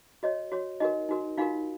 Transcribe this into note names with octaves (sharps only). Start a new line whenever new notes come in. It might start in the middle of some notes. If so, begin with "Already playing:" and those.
F#4 C#5 D#5
F#4 C#5
D#4 F#4 A#4 D#5
D#4 F#4 A#4
D#4 F4 F#4 A#4 F5